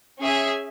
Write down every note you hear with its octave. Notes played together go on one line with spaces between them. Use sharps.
C#4 G#4 E5 G#5